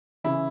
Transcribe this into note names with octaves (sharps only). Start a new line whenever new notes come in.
C#3 E3 E4